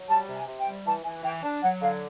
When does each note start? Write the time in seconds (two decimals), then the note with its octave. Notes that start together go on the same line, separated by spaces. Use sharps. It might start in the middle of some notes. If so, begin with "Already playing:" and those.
Already playing: F#3
0.08 G3 A5
0.28 C3
0.34 G#5
0.47 C3
0.60 G5
0.66 G3
0.85 E3 A5
1.04 E3 G#5
1.23 E3 G5
1.43 D4 A5
1.62 F#3 F#5
1.81 D3 F5